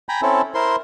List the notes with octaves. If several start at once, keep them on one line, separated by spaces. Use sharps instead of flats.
G5 G#5 A#5 B5
C4 C#4 E4 A4
E4 A#4 C5 C6